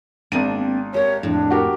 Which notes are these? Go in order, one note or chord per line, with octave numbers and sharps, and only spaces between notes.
G#1 A#3 C4 D4 D#7
G4 A#4 C#5
F2 A2 D4
F#4 G4 A#4